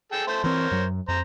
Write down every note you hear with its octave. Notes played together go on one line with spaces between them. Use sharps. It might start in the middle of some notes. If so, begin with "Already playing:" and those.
G#4 A4 G5
A3 C5
E3 C4 A#4 C5 C#5
F#2 F#3
F2 C5 A#5